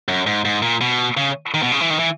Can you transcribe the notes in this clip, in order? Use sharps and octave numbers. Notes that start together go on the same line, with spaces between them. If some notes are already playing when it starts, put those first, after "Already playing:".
F#2
G#2
G#2
A#2
B2
C#3
D#3
B2
C#3
E3
D#3
E3